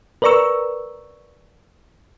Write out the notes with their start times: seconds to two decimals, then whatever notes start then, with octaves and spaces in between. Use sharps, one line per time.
0.22 A#4 B4 D5 A#5 C#6 E6